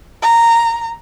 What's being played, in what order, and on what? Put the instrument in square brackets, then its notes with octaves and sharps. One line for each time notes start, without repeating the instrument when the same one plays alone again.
[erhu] A#5